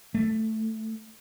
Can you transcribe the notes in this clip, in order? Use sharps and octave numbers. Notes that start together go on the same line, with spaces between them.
A3